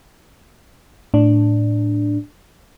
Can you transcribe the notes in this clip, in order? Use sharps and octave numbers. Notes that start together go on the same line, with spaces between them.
A2 D4